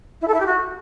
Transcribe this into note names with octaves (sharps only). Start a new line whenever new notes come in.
E4
A4
E4
G4
F#4